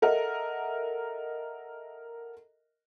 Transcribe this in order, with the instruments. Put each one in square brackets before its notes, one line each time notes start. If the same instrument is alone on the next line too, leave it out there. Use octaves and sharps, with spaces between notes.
[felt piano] A4 A#4 D#5 E5 F#5